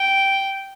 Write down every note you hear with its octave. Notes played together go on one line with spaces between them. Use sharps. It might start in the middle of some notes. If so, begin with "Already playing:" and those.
Already playing: G5